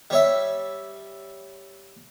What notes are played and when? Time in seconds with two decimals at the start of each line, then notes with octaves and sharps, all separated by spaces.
0.10 G3 C#5 E5